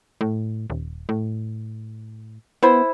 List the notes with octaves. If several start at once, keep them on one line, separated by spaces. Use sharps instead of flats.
A2
D#1
A2
B3 E4 C5 B5